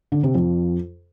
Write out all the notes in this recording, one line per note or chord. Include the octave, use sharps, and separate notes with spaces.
D3
C3
F2